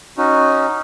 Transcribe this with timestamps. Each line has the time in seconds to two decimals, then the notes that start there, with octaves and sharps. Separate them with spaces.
0.18 C#4 D#4 F#4